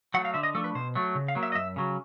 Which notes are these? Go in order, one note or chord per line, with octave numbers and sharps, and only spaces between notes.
F#3 A3 F#5
F5
D3 E5
D#5
F3 A3 D4 A4
B4
B2 C5
F#3 A3
C#3
F5
F#3 A#3
E5
D#5
F#2 E5
C#3 F#3